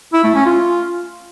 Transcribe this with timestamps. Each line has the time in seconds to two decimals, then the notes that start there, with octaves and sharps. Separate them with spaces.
0.13 E4
0.24 A3
0.35 C#4
0.46 F4